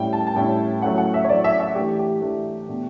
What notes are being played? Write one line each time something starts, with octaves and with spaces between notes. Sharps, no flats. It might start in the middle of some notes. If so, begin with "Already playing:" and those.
Already playing: A2 G3 C#4 E4 G5
A5
A5
A2 G3 C#4 E4 G5
F#3 A3 C#4 E4 F#5
F#5
E5
C#5
F#3 A3 C#4 E4 D5
E5
E5
E3 A3 D4 G4
G4
E3 A3 D4
B2 A3 D4